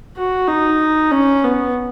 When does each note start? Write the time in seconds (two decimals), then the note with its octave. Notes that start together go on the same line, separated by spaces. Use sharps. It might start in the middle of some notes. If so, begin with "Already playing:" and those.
0.16 F#4
0.47 D#4
1.11 C#4
1.44 B3